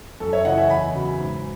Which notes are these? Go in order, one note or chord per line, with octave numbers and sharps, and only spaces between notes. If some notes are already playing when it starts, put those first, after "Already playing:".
F#2 A4
C#5 E5
C#3 E3 D#5 F#5
E5 G#5
E2 G#5 B5
C#3 F#3
G#2